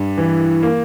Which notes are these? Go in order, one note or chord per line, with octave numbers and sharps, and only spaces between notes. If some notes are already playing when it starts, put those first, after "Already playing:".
Already playing: G2
E3
A#3